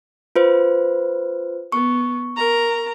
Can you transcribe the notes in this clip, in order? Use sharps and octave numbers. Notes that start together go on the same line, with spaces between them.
F4 B4 C5
B3 C#6
A#4 A#5